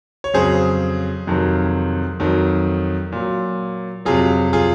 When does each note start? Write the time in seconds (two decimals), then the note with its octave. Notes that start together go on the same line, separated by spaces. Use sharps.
0.24 C#5
0.34 F2 C#3 F#3 G#4 C5
1.27 F2 C3 D#3 F#3
2.20 F2 D#3 F#3
3.12 A#2 F#3
4.05 F2 C3 F#3 F4 G#4
4.53 F4 G#4